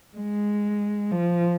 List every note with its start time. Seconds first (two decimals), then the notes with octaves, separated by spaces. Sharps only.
0.16 G#3
1.12 F3